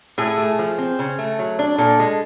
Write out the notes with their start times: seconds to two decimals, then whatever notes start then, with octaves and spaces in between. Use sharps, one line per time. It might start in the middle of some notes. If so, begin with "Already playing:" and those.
0.18 A2 G#4
0.38 A3
0.59 F3
0.78 C4
0.99 C#3
1.19 A3
1.39 F#3
1.59 D4
1.78 A#2 A4
1.99 G#3